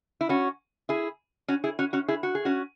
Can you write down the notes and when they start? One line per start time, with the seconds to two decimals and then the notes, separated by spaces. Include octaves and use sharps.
0.21 E4
0.29 C#4 F#4
0.89 E4 G#4
1.48 C#4 F#4
1.64 E4 G#4
1.79 C#4 F#4
1.93 C#4 F#4
2.08 E4 G#4
2.23 F#4
2.35 G#4
2.45 C#4 F#4